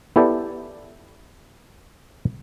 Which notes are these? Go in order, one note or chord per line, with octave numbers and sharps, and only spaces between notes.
B3 E4 G4 A4 D5 G5